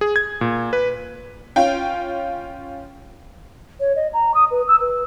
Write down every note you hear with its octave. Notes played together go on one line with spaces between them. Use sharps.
G#4
G#6
A#2
B4
C#4 F4 F5 G5
C#5
D#5
A#5
D#6
B4
E6
B4